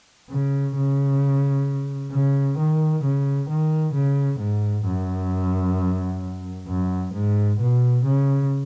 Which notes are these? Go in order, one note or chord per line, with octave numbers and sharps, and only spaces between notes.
C#3
C#3
C#3
D#3
C#3
D#3
C#3
G#2
F#2
F#2
G#2
B2
C#3